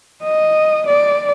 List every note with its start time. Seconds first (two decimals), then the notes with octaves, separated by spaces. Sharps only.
0.23 D#5
0.87 D5